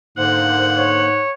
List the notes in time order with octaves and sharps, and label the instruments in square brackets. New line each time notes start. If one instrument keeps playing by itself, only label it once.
[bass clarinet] G#2 [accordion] D3 A#3 C5 [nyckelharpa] F#5
[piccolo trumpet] C#5